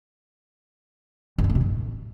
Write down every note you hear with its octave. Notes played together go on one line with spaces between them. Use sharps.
F#2
D3
A#3
C3
A2